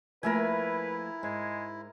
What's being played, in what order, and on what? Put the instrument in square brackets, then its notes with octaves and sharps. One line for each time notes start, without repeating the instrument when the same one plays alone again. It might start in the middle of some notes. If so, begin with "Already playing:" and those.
[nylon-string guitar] F3 A3 A#3 [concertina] E4 [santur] A#4 E5 G#5 [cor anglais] B4
[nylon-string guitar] G#2 [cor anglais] G#3